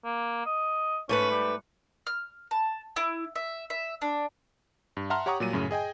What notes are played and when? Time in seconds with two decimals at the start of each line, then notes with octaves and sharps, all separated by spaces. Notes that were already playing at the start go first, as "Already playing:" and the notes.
0.04 A#3
0.46 D#5
1.09 G#2 A3 C#4 B4
1.31 G3
2.07 F6
2.51 A5
2.96 E4
3.36 E5
3.70 E5
4.02 D4
4.97 G2
5.10 E5 F#5 A5 A#5 C6 F6
5.26 G4 C#5 F#5 A#5 C#6 D#6
5.40 A#2 F#3 G3 D#7
5.53 F#2 A2 C#3
5.71 G#4 D#5 G5 G#5